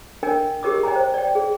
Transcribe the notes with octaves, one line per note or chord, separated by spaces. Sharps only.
D4 A#4 D#5 G5 G#5
G4 G#4 A#4 D#5 D6 D#6
D#5 G5 G#5 A#5
C5
D5 G5
G#4